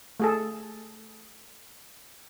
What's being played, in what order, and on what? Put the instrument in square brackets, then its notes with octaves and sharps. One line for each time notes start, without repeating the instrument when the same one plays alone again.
[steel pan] A3 G#4 A4